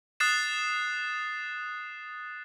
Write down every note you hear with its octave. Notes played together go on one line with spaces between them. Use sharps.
D#6 F#6 A6 C7 E7